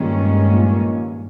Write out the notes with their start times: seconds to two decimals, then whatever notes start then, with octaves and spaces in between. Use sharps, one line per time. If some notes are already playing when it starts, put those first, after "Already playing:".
Already playing: A#1 G2 A#2 D#3 G#3 C#4
0.49 A#1 A#2